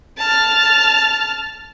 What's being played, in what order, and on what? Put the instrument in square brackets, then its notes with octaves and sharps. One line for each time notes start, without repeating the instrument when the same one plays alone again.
[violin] A5 F6